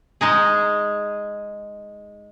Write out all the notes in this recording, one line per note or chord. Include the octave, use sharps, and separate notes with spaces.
G#3 D#4 G#4